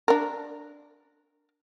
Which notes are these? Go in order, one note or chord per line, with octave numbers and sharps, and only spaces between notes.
D4 A#4